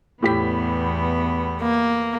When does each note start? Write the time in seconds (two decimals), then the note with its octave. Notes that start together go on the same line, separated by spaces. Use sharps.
0.22 E2 A2 B3 G4 B6
1.62 A#3